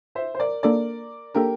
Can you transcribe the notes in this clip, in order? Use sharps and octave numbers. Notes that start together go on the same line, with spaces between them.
C5 E5
C5
A#4 D5
A#3 D4 A4 A#4 D5
A#3 D4 G4 A4 A#4